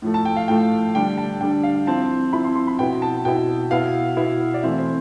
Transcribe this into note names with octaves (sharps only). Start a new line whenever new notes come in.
A2 F3 A3
A5
G5
F5
A2 F3 A3 G5
D3 G3 D4 G5
A5
D3 G3 D4 G5
F5
F3 C4 E4 A5
F3 C4 E4 B5
C6
C6
B5
B2 B3 E4 G5
A5
B2 B3 E4 G5
B2 B3 E4 F5
B2 B3 E4
D5
E3 A3 C4 E4 E5
C5